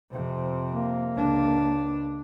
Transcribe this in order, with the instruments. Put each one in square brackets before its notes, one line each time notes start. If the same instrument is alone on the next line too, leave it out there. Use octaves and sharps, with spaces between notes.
[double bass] F2 C3
[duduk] A#3
[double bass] C#2 D4